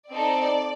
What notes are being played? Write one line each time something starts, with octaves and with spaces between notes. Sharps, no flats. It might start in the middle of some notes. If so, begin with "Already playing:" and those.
C4 D#4 A4 D5